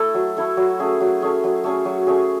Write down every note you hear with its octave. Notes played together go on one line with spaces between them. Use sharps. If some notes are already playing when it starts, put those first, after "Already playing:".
Already playing: A3 E4 A4
F#3
A3 E4 A4
F#3
A3 C#4 G#4
F#3
A3 C#4 G#4
F#3
A3 C#4 G#4
F#3
A3 C#4 G#4